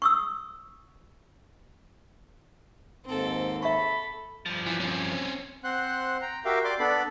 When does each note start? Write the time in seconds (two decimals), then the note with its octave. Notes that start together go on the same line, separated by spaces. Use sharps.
0.02 C#6 D#6 E6
3.05 D#2 G#2 C4 A4
3.63 A4 E5 B5 C#6
4.46 G2 F3
4.67 E3
4.80 C4 C#4
5.64 C4 C5 F#5 C6 F#6
6.22 G5 A#5
6.45 F#4 G4 A#4 E5 F5 G5
6.64 D5 C6 D6
6.79 B3 D4 A4 D5 B5